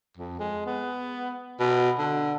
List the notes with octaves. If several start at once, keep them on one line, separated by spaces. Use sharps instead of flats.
F2
G#3
B3
B2
D3